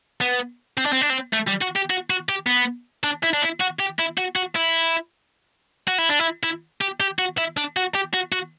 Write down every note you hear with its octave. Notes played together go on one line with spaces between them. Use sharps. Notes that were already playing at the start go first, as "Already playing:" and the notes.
B3
C4
D4
C4
D4
C4
A3
G3
F#4
G4
F#4
F#4
G4
B3
D4
E4
D4
E4
F#4
G4
E4
F#4
F#4
E4
F#4
E4
D4
E4
E4
G4
G4
F#4
E4
D4
F#4
G4
F#4
F#4